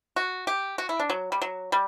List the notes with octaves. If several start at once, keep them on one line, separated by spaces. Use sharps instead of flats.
F#4
G4
F#4
E4
D4
F#3
G3
F#3
G3